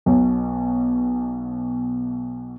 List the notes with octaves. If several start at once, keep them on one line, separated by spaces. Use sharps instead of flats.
B1 B2 F#3